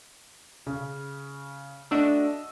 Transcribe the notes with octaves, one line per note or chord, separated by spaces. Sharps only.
C#3
A3 D4 F#4 D#5 E6